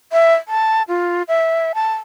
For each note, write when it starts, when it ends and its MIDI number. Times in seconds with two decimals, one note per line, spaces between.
0.12 0.35 76
0.48 0.83 81
0.88 1.22 65
1.28 1.72 76
1.75 1.92 81